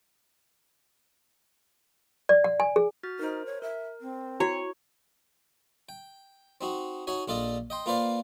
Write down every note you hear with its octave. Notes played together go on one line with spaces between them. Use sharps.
D5
F#5
G#5
G#4
F#4 F6 A6
D#4 A#4 C5
C#5
A#4 E5
C4
E4 F#4 C#5
G5
C4 D#4 F#4
D#4 F#4 C#5 F#5 G#5
A#1 D4 F4 A4 D5 D#5
D#5 G5 C6
A#3 F4 B4 C5 D5 F5